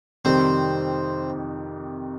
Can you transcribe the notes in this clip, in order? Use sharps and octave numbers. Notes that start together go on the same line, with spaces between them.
F2 C3 D#3 G3 C4